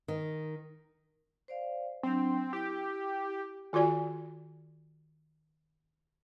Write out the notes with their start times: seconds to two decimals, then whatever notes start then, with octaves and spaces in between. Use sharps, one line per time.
0.08 D#3
1.48 C5 D5 F5
2.03 F#3 C4 D4
2.53 E4 G4 G5
3.73 D#3 F4 F#4 D5 G#5